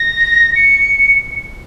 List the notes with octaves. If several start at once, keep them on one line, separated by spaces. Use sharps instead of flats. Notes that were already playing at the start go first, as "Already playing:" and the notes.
Already playing: A#6
C#7